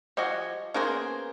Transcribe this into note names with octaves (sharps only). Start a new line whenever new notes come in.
F3 G3 F#4 D#5 G#5
A#3 B3 C#4 G#4 A#4 C5